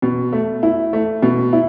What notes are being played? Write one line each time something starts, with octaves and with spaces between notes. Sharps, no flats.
B2
A3
E4
A3
B2
E4